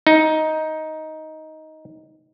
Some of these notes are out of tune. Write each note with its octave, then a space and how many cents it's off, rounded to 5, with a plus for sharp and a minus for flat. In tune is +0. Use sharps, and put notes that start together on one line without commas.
D#4 +10